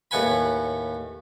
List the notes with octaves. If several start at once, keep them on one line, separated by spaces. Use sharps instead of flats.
D#2 A2 B4 F#5 G#5 B5